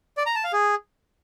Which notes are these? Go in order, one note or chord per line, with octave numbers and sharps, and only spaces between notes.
D5
A#5
A5
F5
G#4